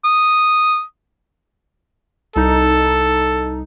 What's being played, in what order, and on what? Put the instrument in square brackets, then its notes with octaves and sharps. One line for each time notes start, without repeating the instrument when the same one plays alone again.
[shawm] D#6
[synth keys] C2 D#4 [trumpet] A4